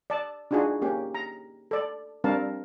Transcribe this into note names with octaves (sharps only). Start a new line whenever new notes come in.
D5 A5
D4 D#4 F4 F#4 G#4
A#3 C#4 G4
A#5
A4 D5
G3 C4 D4 A#4 F5 A5